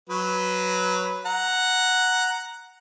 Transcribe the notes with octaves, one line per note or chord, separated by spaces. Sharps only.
F#3 B4
F#5 A#5